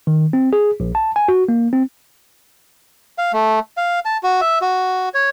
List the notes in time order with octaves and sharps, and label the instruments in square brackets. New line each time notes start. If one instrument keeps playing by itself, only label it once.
[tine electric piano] D#3
C4
G#4
A#1
A5
G#5
F#4
A#3
C4
[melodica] F5
A3
F5
A5
F#4
E5
F#4
C#5